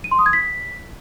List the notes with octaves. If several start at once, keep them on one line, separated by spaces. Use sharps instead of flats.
D#7
C6
D#6
G#6
B6